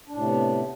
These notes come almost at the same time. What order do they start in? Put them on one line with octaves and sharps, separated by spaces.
D4 A2 C3 B3